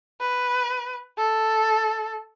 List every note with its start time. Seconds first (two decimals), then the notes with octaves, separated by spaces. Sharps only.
0.21 B4
1.18 A4